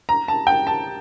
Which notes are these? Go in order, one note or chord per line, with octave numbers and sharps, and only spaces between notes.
A#5
A5
G5
A5